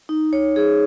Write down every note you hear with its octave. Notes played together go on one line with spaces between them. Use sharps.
D#4
C#5
G#4